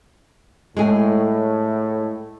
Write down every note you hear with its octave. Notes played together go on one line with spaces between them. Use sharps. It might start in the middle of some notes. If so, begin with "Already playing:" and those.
A2 G#3 G#4